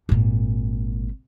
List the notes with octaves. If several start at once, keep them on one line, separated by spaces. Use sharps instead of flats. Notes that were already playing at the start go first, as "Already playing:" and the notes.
G#1 A#2